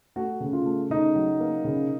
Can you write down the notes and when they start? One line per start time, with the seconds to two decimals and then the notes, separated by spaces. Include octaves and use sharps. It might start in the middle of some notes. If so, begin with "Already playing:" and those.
0.16 A3 F#4
0.40 C#3
0.53 F4
0.66 A3
0.90 C#3 D#4
1.15 F#3
1.40 A#3
1.64 C#3